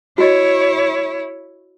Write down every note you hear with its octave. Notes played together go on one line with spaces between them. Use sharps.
E4 F#4 C#5 D#5